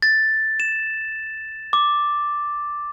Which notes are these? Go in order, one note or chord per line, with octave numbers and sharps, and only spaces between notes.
A6
E7
D6